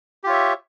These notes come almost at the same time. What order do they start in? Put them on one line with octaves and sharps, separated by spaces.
G4 F4 C#5 E5